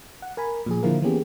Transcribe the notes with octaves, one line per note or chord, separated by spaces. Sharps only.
F#5
A#4 G#5 B5
A#2 F3 G#4
D3 F3 A#3 E4 F4 A#4
E3 A#3 B3 C#4 G4 G#4